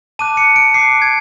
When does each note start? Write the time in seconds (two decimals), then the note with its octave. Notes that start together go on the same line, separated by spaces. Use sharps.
0.19 A5 D6 F#6 D#7
0.37 C#7
0.56 D7
0.74 A5 D6 F#6 C7
1.02 G#6